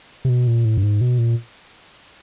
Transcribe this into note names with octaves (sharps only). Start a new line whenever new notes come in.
C3
B2
A#2
A2
G2
G#2
B2
A#2